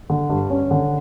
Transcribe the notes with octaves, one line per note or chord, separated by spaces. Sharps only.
D3
G2
C#4
D3